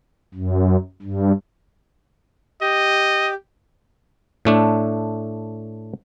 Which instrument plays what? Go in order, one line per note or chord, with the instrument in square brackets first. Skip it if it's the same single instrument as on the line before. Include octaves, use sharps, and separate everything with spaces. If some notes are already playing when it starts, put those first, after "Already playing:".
[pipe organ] F#2
G2
[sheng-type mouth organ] G4 [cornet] D#5
[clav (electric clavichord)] A2 A3 D4